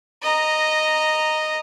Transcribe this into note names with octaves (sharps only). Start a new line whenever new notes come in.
D#5 A#5